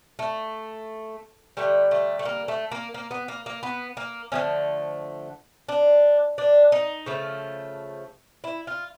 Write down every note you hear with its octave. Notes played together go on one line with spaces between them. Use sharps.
A3
D3 G3 A3
A3
A3
A#3
A3
A#3
A#3
B3
A#3
A#3
B3
A#3
D3 F3 A3 C#4
D4
D4
D#4
C#3 F3 A3
E4
F4